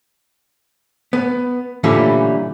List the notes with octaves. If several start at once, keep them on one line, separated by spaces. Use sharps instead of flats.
B3
A#2 D3 E3 G3 A3 C#4